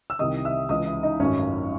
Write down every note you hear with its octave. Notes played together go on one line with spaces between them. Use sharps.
E6
C2 C3 D#3 D#5 D#6
E5 E6
C#2 C#3 E3 D#5 D#6
E4 E5
D#4 D#5
G#1 F#2 D#3 F#3 A3 C#4 C#5